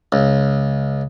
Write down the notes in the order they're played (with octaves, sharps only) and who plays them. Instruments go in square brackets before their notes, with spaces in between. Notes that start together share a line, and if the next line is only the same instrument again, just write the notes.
[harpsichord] C#2